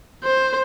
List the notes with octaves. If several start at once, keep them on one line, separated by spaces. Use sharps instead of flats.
C5